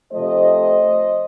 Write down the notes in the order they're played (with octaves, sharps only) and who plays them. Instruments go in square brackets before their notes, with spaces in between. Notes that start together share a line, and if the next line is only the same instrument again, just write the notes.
[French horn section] C3 F3 A3 C5 D#5